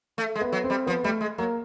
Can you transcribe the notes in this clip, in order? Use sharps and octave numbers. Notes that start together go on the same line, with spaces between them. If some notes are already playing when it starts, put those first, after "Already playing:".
A3
G#3
B3
F#3
C4
G3
F3 B3
G3 A3
G#3
F#3 A#3